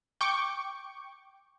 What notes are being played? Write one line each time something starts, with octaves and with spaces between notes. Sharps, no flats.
G5 C#6 D6